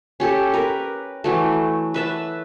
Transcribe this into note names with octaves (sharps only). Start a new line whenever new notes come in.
C#4 G4 A4
A#4 B4
E3 F#3 A3
B4 E5 A5